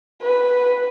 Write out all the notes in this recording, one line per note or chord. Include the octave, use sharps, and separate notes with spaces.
B4